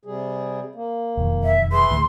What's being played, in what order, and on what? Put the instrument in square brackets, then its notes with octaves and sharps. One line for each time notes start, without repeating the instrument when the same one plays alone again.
[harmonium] C3 G3 G#4
A#3
[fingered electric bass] E1 F2 D#3
[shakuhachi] E5
[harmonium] G#4 B4 E5 [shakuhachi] C6
[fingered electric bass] D2 A2 E3